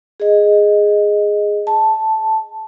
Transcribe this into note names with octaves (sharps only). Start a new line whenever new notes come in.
G#4 D#5
A5